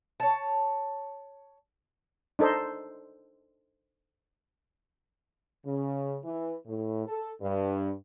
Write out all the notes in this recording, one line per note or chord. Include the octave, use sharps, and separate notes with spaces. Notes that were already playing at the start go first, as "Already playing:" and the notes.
C#5 A5
D4 D#4 A4 C5
C#3
E3
A2
A4
G2